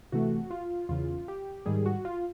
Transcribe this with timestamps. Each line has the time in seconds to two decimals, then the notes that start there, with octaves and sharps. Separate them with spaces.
0.12 C3 E3 A3 F#4
0.51 F4
0.89 E2 C#3 E3 F4
1.28 G4
1.66 G#2 D#3 G3 G#4
1.86 F#4
2.05 F4